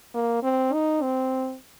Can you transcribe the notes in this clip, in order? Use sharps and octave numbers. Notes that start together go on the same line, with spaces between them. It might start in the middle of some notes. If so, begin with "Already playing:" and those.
A#3
C4
D#4
C4